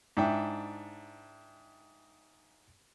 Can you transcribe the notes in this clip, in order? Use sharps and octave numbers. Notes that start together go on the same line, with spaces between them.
G#2 D4 E4 G5